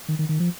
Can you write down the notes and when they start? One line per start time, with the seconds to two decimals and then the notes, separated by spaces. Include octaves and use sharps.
0.08 D#3
0.19 D#3
0.29 D#3
0.40 F3